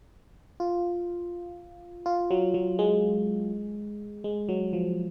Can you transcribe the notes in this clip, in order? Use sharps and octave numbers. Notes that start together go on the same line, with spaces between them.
F4
F4
F#3
F#3
G#3
G#3
F#3
F3